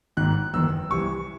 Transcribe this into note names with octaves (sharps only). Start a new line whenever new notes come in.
G#1 G#2 D#3 F#6
F#1 E2 D#3 E6
C2 C3 E3 C#6